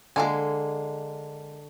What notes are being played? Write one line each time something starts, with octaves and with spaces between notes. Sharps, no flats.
D3 G#3 A#3 G#5